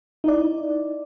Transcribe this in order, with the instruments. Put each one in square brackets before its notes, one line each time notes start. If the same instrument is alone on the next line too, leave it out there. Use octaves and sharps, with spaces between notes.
[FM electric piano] D#4 E4 D5